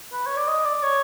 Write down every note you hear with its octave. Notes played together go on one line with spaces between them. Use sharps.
B4
C#5
D5
D#5
D5
C#5